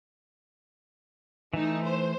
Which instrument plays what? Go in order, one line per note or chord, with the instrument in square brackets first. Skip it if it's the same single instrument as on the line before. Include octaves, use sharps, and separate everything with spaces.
[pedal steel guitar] E3 A3 [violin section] D#4
[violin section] C5